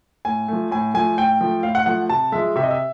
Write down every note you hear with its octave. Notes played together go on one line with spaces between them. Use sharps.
A2 G#5
F3 A3
A2 G#5
F3 A3 G#5
A2 G5
F3 A3
A2 F5
F#5
F3 A3 F#5
C3 A5
F3 G#3 E5
C3 E5
D#5
E5